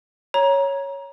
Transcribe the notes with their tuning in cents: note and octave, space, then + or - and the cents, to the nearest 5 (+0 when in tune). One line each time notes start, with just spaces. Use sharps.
C#5 +0 A#5 +25